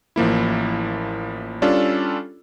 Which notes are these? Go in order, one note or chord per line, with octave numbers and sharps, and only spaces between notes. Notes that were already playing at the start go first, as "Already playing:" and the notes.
A1 F3 A#3 E4
G3 C#4 D4 F4 A4